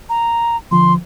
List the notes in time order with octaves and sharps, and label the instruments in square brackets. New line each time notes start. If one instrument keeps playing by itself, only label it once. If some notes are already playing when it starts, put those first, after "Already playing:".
[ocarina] A#5
[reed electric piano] D3 F3 [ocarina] C6